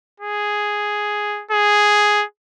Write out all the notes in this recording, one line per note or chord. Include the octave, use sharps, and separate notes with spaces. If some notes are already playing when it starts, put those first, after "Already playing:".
G#4
G#4